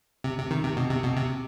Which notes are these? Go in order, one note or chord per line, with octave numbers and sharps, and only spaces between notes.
C3
C3
D#3
C3
B2
C3
B2
C3